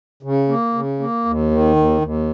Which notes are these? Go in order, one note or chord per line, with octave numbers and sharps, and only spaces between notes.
C#3
A#3
C#3
A#3
D#2
D#3
D#2
D#2